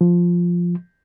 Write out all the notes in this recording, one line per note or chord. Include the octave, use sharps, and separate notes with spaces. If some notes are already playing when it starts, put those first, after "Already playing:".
F3